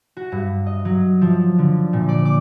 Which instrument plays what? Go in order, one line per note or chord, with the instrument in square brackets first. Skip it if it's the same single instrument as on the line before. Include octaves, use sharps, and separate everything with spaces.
[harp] F#4
G2
D#5
F#3
F3
D3
A#2
D5
D6